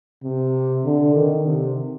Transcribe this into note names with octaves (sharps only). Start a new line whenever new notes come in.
C3
D3
D#3
C3